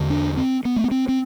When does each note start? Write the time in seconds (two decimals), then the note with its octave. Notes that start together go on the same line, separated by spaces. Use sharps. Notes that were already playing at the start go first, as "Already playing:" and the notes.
Already playing: E2 D3
0.10 D4
0.37 C4
0.65 B3
0.76 A3
0.84 B3
0.91 C4
1.08 C4